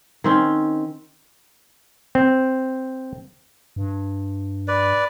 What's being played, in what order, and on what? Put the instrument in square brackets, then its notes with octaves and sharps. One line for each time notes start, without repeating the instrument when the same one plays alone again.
[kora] D#3 C4 C#4
[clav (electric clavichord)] C4
[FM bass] G2
[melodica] B4 D5